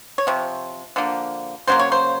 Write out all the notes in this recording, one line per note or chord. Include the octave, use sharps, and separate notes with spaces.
C#5
C3 F3
D3 F3 A#3
C#3 F#3 A#3 C5
C#5
C5